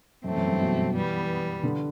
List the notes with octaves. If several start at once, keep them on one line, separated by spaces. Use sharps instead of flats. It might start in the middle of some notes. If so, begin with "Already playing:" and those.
F#2 E3 A3 C4
F#2
G2
B2
E3 G3 B3
D3